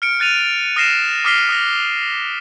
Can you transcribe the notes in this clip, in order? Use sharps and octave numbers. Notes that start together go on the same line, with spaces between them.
F6 C#7 D7
F#6 A6 D#7 F7
D#6 F6 A#6 C7 E7
D6 D#6 F6 B6 C7 G7
D#6 F6 A#6